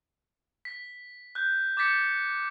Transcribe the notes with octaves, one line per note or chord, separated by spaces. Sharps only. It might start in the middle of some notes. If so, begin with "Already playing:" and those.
B6
F#6 G6
D6 G6 A6 B6 C#7